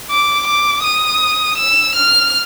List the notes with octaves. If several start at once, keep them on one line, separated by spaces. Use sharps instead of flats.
D6
D6
D#6
E6
F6